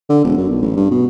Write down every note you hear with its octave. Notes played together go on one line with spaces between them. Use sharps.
D3
E1
F#2
B1
A1
G2
B2